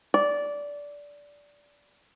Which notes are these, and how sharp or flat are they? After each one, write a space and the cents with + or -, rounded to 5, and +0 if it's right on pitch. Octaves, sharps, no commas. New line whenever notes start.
D5 -15